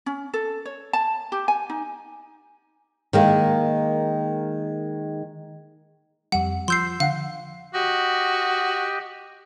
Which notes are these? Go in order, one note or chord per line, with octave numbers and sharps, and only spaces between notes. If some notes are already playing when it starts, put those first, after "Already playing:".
C#4
A4
C#5
A5
G4
G#5
D#4
D#3 G#3 A#3
F2 G3 F#5
F3 C6 E6 G6 C7
D3 F5 F#5
F#4 G4 D#5